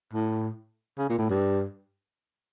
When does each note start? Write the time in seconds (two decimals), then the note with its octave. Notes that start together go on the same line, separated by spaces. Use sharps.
0.13 A2
0.98 C#3
1.09 A#2
1.18 A2
1.29 G2